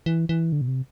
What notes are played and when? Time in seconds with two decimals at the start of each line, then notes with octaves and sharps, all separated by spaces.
0.06 E3
0.29 E3
0.52 D3
0.61 B2
0.68 C3